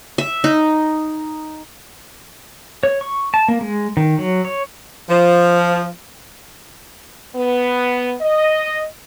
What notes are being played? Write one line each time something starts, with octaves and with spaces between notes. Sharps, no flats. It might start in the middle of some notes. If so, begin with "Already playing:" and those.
E5
D#4
C#5
C#6
A5
A#3
G#3
D#3
F#3
C#5
F3
B3
D#5